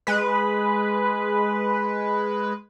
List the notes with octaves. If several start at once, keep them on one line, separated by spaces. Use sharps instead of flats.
G#3 B4